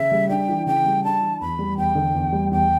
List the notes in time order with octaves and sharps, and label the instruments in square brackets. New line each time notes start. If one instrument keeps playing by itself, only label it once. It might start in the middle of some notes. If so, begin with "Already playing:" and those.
Already playing: [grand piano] C#3 [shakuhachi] E5
[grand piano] G3
[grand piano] D4 [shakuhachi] G5
[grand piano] E3
[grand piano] C#3 [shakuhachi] G5
[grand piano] G3
[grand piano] D4 [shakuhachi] A5
[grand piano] E3
[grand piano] E2 [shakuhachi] B5
[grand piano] G3
[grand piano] E2 [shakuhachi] G5
[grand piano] D3
E2
G3
[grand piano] E2 [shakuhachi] G5